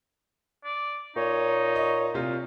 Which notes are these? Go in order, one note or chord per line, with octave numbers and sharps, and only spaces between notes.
D5
A#2 D#4 C#5
D#5
C3 F4